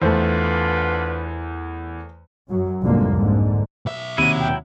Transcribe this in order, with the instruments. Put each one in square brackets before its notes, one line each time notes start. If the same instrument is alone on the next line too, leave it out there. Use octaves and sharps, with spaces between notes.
[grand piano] E2 [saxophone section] D3 F4 B4 [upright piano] A3 C5
[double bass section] F#2 F#3
C2 F2 G#2 D3 A#3
G#2 D3
[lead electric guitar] B1 E5
[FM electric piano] D#2 C3 [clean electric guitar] F#3 E4 [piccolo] D#7
[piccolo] G5